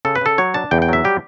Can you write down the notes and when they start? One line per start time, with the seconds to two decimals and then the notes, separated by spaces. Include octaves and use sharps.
0.05 C#3 A4
0.15 B4
0.21 C#3 A4
0.38 F#3 C#5
0.54 D4 A5
0.71 E2 G5
0.82 G5
0.88 F#3 E5
1.04 G3 G4